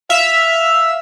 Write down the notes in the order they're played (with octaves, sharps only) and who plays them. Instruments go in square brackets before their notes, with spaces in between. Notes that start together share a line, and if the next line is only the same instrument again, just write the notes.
[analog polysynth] E5 [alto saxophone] F5